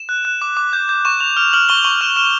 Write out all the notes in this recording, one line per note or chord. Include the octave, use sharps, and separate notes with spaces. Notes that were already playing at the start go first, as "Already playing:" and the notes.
Already playing: E7
F#6
F#6
D6
D6
G6
G6
C#6 E7
C#6 F7
F6 F7
F6 F#7
C#6 G7
F7
C#6 F#7
F6 E7
F6 E7